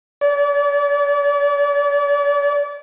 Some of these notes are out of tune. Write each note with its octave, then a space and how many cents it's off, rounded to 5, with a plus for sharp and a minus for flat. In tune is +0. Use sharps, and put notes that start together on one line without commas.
D5 -40